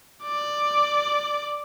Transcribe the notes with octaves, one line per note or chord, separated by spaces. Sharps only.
D5